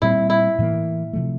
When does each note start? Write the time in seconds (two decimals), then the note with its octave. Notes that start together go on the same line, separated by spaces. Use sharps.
0.02 A#2 G3 C4 E4
0.30 E4
0.59 A2 E3 A#3
1.13 C3 F3 A3